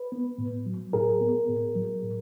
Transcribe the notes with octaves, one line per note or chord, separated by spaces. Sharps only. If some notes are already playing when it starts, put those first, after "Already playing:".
Already playing: B4
B3
A2
F#3
A2 G#4 A#4
B3
A2
F#3
A2